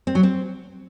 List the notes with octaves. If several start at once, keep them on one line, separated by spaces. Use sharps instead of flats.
C4
F#3
C4